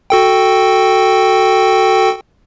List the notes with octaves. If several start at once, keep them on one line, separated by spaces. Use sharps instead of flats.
F#4 A4 G5